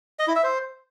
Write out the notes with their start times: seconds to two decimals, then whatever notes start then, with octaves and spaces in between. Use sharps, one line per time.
0.19 D#5
0.27 E4
0.35 E5
0.43 C5